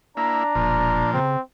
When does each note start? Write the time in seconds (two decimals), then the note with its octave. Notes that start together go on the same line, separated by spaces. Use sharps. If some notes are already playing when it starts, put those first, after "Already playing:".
0.17 A#3 D4 E4 A#5
0.55 E1 A#2 F3
1.13 C#3 C4